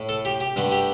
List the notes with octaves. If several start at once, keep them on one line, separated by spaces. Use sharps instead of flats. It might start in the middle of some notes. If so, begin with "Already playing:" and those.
Already playing: A2 A3
A4
G4
G4
G2 D3 A3
G4